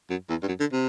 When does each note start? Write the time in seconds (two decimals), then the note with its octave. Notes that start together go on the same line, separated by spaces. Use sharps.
0.10 F#2
0.29 E2
0.43 G2
0.48 F#2
0.60 D3
0.73 C3